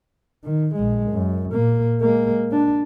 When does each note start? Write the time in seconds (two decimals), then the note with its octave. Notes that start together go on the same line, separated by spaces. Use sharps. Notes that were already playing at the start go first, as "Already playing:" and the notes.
0.44 D#3
0.75 A#1 G#3
1.11 F#2
1.53 A#2 A#3
2.01 G#3 A#3
2.52 D4